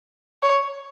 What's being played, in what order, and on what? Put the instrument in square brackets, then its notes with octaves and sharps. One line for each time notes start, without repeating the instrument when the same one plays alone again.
[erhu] C#5